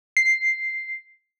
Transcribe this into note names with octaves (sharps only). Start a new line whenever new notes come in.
C7